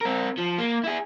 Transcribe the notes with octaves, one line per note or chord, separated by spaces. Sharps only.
C4 A#4
F3
A#3
E4 G#4